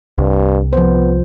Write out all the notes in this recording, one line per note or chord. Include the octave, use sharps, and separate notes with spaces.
C2 G2
F3 B3 C5